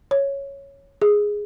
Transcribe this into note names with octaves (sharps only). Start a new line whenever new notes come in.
C#5
G#4